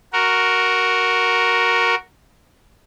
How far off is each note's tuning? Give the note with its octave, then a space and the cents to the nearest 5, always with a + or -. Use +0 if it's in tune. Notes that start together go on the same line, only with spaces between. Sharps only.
F#4 +0 A#4 +0